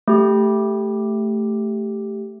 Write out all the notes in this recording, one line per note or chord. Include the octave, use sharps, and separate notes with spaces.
A3 G4